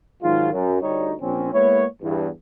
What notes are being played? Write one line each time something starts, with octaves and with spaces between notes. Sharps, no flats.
G#2 D#3 F#3 G#3 F4
F#2
D2 G3 D#4 C#5
A#1 C4 C#4
G#3 A#3 B3 E4 C#5
E2 G2